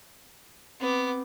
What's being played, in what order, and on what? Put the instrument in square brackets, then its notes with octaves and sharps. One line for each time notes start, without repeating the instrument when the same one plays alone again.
[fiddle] B3 D6 [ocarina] C4